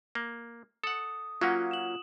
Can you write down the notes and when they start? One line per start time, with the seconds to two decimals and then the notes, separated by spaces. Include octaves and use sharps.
0.15 A#3
0.84 A4 F#5 D#6
1.41 F#3 A#3 C#4 F4 F#5
1.71 E7 F#7